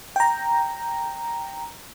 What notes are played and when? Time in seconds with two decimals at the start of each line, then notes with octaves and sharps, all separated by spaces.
0.16 G5 A#5